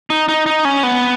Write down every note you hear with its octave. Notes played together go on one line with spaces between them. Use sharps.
D#4
D#4
D#4
C#4
B3